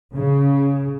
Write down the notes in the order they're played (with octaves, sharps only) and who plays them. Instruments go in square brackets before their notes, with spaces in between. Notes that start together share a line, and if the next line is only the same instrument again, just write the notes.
[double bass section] C#3